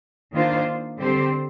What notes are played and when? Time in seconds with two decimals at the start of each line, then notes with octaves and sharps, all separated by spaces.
0.33 D#3 A#3 D4 F4 C5
0.97 D3 G3 C4 G4 C5